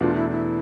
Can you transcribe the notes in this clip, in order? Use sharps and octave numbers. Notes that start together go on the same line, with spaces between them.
E2 B2 A3 D4 F4
E4
E4